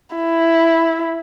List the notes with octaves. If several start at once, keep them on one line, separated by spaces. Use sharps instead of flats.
E4